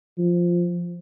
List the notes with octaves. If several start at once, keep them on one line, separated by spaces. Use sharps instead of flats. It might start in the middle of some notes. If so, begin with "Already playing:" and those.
F3